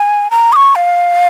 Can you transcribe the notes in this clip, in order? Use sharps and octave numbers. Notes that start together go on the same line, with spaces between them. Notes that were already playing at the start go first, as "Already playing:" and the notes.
Already playing: G#5
A#5
D#6
C#6
F5